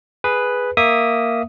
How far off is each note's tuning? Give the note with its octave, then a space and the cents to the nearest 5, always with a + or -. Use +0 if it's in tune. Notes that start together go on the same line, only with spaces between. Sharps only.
G#4 +0 B4 +0
A#3 +0 E5 +0 D#6 +0